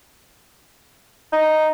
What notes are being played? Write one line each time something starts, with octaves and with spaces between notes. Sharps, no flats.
D#4